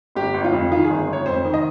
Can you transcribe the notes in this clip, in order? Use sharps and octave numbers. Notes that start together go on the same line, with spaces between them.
G1 G4
G1
F4
F2
D#3 F4
G#4
G1
G1
C#5
F2 C5
D#3
D#5